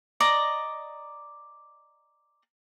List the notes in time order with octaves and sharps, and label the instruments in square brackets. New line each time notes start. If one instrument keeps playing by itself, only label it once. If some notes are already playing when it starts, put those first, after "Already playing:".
[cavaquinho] D5 D#5 A#5